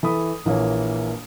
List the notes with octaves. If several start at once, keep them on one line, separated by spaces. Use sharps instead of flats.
E3 A4 B5 D#6
A#1 E3 A#3 C#5